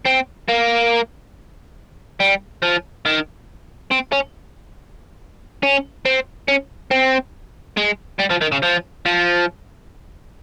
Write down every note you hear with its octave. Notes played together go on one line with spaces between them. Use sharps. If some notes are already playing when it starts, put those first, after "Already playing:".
C4
A#3
G3
F3
D#3
C4
C#4
C#4
C4
C#4
C4
G#3
G3
F3
D#3
C#3
F3
F3